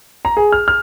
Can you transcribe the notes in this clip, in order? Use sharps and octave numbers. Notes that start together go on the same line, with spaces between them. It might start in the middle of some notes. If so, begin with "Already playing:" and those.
A#5
G#4
F6
F6